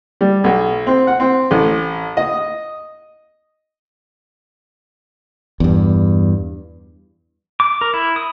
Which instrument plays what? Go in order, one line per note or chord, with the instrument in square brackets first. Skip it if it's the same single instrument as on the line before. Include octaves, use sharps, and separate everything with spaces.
[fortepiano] G3
B1
C4
F#5
C4
A1
D#5
[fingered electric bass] E2 G2
[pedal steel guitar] D6
A#4
E4
D#6